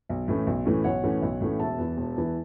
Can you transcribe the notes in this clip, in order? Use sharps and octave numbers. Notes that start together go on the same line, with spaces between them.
B1
A2 E3 A3 C#4
B1
A2 E3 A3 C#4
B1 C#5 F#5
A2 E3 A3 C#4
B1
A2 E3 A3 C#4
E1 E5 A5
E2 E3
E1
E2 E3